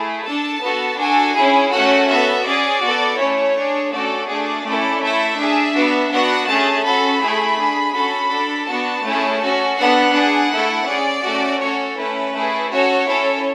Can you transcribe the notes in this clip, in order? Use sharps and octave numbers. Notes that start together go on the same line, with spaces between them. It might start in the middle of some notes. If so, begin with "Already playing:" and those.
Already playing: A3 E4 G#4
D4 A4 A5
B3 F#4 A4
D4 F#4 A4 G#5
C#4 E4 G#4
A3 C#4 F#4 A4 F#5
B3 F#4 A4 E5
C#4 G#4 D5
B3 F#4 A4
A3 C#4 E4 C#5
D4
G#4
A3 C#4 F#4 A4 D5
A3 D4 G#4 D5
A3 C#4 E4 A4
A3 E4 A4 E5
D4 G#4
B3 D4 F#4
B3 D4 F#4 F#5
A3 C#4 G#4 A5
C#4 F#4 A4 B5
A3 E4 G#4
D4 G#4
C#4 F#4 A4 B5
D4 A4
B3 D4 F#4 A5
A3 C#4 E4 G#4
C#4 F#4 A4
B3 D4 A4 F#5
D4 G#4
A3 E4 A4
C#4 G#4 D5
A3 C#4 F#4 A4
C#4 F#4 A4 C#5
A3 C#4 E4 B4
A3 E4 G#4
C#4 F#4 A4 C#5
C#4 E4 A4